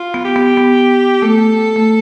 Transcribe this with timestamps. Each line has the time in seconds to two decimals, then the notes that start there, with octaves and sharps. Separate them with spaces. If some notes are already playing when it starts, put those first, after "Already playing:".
Already playing: F4
0.14 B3
0.25 G4
0.36 B3
0.57 B3
1.22 A3 A4
1.76 A3